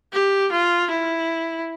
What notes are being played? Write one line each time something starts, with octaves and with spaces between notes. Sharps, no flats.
G4
F4
E4